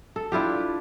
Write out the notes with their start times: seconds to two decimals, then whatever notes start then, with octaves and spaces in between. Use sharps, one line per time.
0.16 A4
0.32 D4 E4 F4 G4